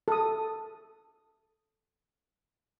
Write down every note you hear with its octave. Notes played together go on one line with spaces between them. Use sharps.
A4 D#6